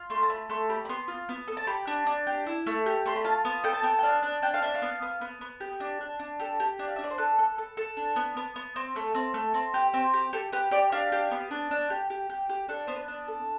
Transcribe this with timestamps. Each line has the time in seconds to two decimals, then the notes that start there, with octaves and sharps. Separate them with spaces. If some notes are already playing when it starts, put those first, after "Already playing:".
Already playing: F4
0.10 A3 C6
0.23 A5
0.30 A3 B5
0.50 A3 C6
0.69 G4 B5
0.85 B5
0.89 B3 C6
1.08 F4
1.29 B3
1.48 A4
1.57 A5
1.67 G4 B5
1.87 D4
2.06 D4
2.27 G4
2.46 E4
2.66 A3
2.86 G4
3.06 A3 C6
3.16 B5
3.25 F4 A5
3.45 B3
3.64 A4 G5
3.74 A5
3.83 B3 G5
3.99 G5
4.03 D4 F5
4.23 D4
4.42 D4 G5
4.54 F5
4.62 D4 E5
4.75 F5
4.82 B3
5.02 B3
5.21 B3
5.41 B3
5.60 G4
5.80 D4
6.01 D4
6.19 D4
6.40 G4 A4
6.60 G4
6.79 D4
6.88 F5
6.96 E5
6.99 D4
7.04 D5
7.10 C5
7.18 A4 B4
7.38 A4
7.58 A4
7.77 A4
7.97 D4
8.16 B3
8.37 B3
8.56 B3
8.76 C4
8.96 A3
9.15 C4
9.34 A3
9.54 C4
9.74 G4
9.94 C4
10.14 G4
10.33 G4 A4
10.52 G4 B4
10.71 G4 D5
10.92 D4 F5
11.12 G4
11.31 B3
11.51 D4
11.71 D4
11.90 G4
12.10 G4
12.29 G4
12.49 G4
12.68 D4 A4
12.87 B3 C5
12.96 B4
13.08 D4
13.28 A4